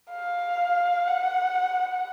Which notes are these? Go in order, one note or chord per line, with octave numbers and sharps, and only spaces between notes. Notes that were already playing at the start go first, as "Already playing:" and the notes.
F5
F#5